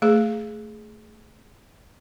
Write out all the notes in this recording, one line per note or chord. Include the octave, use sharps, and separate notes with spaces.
A3 G#4